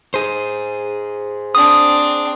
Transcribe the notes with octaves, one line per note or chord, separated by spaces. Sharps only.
G#4 C5
C4 D4 D#6